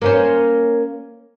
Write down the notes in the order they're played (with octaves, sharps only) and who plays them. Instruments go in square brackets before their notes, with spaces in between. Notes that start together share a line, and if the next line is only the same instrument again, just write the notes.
[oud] A#3 C#4 C5